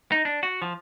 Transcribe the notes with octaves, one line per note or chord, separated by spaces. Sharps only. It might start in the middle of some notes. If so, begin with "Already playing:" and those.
D#4
D4
F#4
F3